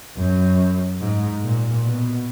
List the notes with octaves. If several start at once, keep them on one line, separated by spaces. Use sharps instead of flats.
F#2
G#2
A#2
B2